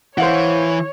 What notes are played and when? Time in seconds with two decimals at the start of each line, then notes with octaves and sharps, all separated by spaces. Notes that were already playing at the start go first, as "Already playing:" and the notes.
0.18 E3 C5 C#5 F5 F#5